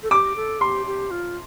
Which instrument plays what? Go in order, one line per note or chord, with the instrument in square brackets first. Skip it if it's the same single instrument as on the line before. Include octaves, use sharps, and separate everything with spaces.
[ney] A4
[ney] G4 [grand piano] D6
[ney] A4
[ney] G4 [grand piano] C6
[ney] G4
F4